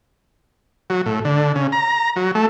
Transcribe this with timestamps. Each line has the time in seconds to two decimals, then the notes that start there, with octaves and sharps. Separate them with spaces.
0.90 F#3
1.06 A2
1.25 D3
1.56 C#3
1.72 A#5
2.16 F#3
2.35 A3